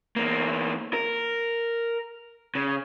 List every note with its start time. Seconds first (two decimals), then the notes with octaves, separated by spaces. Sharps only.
0.16 E2 A#3
0.93 A#4
2.55 C#3